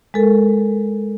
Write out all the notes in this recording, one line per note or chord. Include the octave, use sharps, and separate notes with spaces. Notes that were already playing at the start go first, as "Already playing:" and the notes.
G#3 A4 A#4